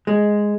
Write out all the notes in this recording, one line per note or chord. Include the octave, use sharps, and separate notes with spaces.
G#3